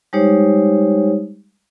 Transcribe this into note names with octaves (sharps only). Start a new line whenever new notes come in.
G3 G#3 D#4 G4 C5 C#5